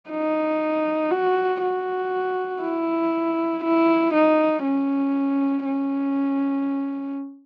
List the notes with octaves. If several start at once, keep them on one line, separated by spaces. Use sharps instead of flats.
D#4
F#4
F#4
E4
E4
D#4
C#4
C#4